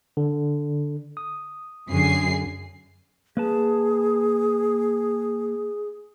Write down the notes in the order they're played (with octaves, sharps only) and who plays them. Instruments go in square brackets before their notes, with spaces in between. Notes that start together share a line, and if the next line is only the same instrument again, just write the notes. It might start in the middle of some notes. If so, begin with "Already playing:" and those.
[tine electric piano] D3
D#6
[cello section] F#2 [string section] D3 G#4 C7
[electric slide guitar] A#3 B4 A5 [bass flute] G#4